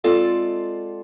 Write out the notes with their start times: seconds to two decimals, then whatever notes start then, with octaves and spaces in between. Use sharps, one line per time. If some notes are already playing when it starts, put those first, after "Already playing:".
0.04 G#3 C4 F4 A4 D5 F5